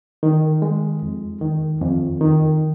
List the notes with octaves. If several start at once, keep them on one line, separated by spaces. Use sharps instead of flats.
D#3
G#3
F2
D#3
F2
D#3